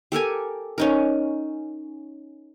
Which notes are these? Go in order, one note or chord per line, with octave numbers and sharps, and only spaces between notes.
G4 A4 A#4 G#5
C#4 D#4 A#4